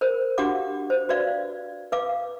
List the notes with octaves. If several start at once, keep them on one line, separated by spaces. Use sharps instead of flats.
A#4 C5
D4 F#4 G4 F5 F#5 D6
C5
F#4 B4 D5 F5
B4 F5 D6